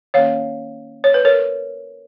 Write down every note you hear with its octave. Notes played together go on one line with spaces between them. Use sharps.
D#3 A#3 C#4 C#5 F5
C#5
B4
A#4 C#5